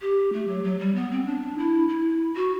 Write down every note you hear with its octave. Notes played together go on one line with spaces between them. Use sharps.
G4
A3
F#3
F#3
G3
B3
C4
D4
E4
E4
F#4